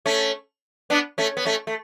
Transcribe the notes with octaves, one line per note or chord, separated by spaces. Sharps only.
A3 C#4
B3 D4
A3 C#4
B3
A3 C#4
A3